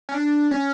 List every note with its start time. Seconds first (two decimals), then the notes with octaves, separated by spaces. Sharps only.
0.09 C#4
0.14 D4
0.51 C#4